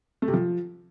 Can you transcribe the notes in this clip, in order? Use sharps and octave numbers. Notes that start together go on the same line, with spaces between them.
A3
C3
F3